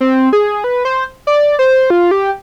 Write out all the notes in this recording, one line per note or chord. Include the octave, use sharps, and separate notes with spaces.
C4
G#4
B4
C5
D5
C5
F4
G4